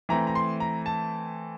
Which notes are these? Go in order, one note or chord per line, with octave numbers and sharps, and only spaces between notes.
E3 A3 C4 A#5
A#5
C6
A#5
A5